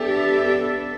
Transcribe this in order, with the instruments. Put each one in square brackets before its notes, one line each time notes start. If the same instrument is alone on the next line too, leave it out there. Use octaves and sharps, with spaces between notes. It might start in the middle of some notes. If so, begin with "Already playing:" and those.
Already playing: [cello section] B3 D4 A4 E5 [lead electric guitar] G4